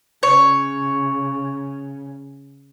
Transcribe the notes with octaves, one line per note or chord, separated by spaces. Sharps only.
C#3 C#5